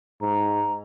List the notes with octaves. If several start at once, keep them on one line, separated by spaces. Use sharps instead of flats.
G#2 A#5